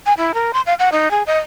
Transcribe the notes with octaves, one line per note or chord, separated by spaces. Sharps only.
G#5
E4
A#4
C6
F5
F#5
D#4
G#4
D#5